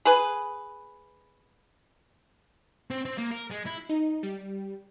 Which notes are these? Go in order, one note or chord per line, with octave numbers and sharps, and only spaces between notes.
G#4 B4
C4
C4
A#3
A#4
G#3
E4
D#4
G3